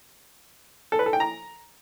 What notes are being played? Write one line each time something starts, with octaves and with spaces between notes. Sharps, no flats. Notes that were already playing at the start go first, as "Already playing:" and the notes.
A4
B4
A4
G5
A#5